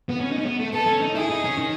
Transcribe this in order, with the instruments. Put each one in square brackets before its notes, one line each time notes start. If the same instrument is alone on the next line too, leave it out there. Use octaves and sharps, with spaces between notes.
[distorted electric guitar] B3
C#4
D#4
C#4
B3
A3
[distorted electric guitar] B3 [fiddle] A4
[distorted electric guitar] C#4
D#4
[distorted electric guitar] E4 [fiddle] G#4
[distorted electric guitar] D#4
C#4
D#3